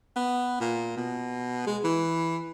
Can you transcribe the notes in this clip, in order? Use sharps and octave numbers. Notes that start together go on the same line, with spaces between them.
B3
A#2
B2
G#3
E3